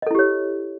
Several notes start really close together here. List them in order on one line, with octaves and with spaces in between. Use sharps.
D#5 A4 E4 G4 C#5